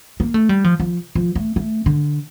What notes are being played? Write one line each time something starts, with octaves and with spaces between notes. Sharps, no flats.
A#3
A3
G3
F3
F3
F3
A3
A3
D3